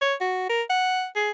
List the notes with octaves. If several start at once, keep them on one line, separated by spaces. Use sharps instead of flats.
C#5
F#4
A#4
F#5
G#4